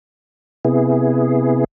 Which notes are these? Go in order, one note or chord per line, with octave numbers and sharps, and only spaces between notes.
C3 B3 E4 G#4